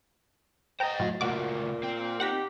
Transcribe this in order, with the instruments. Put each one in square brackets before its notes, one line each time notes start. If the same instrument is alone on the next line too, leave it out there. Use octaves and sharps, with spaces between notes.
[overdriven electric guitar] C5 D#5 [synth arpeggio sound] G5 A#5
[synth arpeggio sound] A2 F#3
[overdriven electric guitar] C#2 A3 [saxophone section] A#2 [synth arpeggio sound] F#4 D6
[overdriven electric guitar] C4
[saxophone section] D#4 G4 [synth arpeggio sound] F#5 A#6 B6